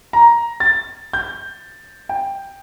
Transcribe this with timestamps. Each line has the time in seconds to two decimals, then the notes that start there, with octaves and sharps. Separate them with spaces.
0.13 A#5
0.60 A6
1.13 G6
2.09 G5